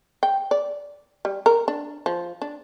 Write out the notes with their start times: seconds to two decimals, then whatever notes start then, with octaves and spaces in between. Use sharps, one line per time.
0.23 G5
0.51 D5
1.25 G3
1.46 A#4
1.68 D4
2.06 F3
2.42 D4